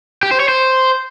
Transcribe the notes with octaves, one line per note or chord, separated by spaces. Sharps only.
G4
C5
C#5
C5